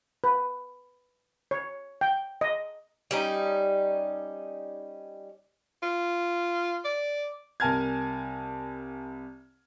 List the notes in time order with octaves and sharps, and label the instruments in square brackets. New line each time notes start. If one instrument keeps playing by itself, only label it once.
[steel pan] B4
C#5
G5
D#5
[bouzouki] G3 C#4 D#4
[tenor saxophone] F4
D5
[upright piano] C2 A#4 G#5 A5 F6 G#6